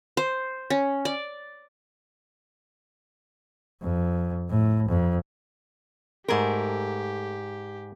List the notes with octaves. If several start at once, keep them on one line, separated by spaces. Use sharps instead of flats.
C5
C#4
D5
F2
A2
F2
G#2 A3 G4 G#4 A#4 G5